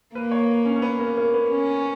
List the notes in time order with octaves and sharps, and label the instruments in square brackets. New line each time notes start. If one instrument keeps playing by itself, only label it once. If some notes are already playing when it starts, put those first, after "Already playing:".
[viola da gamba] A#3 [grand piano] B4
[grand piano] C#5
C#4
C#4
B3
A#3
A#3
B3
[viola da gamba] C#4